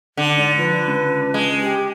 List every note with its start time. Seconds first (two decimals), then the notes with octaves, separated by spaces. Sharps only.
0.17 D3
0.37 G#2 D5
0.58 F3 B4
0.87 C#2
1.34 G#3
1.60 G4